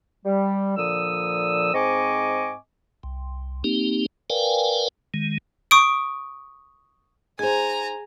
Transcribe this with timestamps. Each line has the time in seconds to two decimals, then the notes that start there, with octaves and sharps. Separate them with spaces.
0.25 G3
0.77 A#2 D3 F3 D#6 E6
1.74 G#2 C4 D#5 G#5 C#6 D6
3.03 C2
3.64 A#3 C4 D#4 G4
4.30 A#4 B4 D5 F5 G5 G#5
5.14 D#3 G#3
5.71 C#6 D#6 D7
7.39 D#4 G#4 C5 G#5 A#5